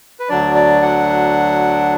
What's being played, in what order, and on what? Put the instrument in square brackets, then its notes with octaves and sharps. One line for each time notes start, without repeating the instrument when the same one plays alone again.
[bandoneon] B4
D2 D3 F#3 D4 D5
D5
F#5